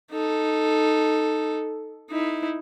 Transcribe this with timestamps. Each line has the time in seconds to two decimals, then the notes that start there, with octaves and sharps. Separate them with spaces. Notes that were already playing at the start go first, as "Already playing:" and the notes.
0.11 D#4 A4
2.10 D#4 E4